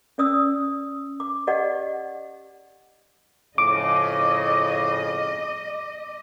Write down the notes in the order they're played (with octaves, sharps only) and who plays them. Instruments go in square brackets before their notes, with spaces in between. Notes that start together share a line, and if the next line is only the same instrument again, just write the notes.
[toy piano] C#4 D5 D#6 E6
D6
G4 D5 D#5 F#5
[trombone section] F2 A2 C#3 [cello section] D#5 [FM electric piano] D6